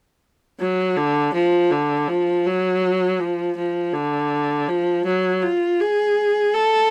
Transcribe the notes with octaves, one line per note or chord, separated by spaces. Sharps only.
F#3
D3
F3
D3
F3
F#3
F3
F3
D3
F3
F#3
F4
G#4
A4